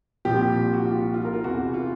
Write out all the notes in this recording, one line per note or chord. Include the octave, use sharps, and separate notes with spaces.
C2 A#2 F3 G4
F#4
F4
F4
A#4
F4
E2 C3 E3 F#4
F4